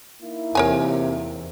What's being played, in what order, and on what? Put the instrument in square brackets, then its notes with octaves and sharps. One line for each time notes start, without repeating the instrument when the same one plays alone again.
[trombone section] A#3 D#4 E4
[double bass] E2 [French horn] C3 [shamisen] A#4 C#5 G#5